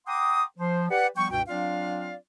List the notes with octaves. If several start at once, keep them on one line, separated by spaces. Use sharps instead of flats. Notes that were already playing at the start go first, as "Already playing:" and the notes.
F#5 G5 A#5 C6 D6 D#6
F3 C5
G4 B4 D5 F#5
F3 G3 B3 G5 C#6
C#2 G2 B2 F#4 G5
F#3 C4 D4 F4 D5 F5